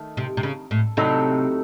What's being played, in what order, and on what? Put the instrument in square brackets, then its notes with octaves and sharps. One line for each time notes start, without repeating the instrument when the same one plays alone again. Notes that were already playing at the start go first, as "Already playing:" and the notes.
Already playing: [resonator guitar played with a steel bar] D#3 A3
[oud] C3
C3
C#3
A2
[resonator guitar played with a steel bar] A2 F#3 A3 D#4 A4 [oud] C3